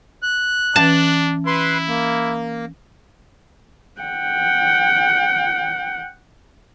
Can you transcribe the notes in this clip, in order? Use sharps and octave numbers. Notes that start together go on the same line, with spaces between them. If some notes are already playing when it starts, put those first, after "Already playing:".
F#6
E3 C#4 D4 A5
E4 B4 C6
A#3
F#5 G5